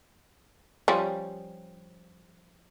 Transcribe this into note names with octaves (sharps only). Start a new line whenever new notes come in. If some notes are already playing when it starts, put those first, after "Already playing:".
F3 G3 C#4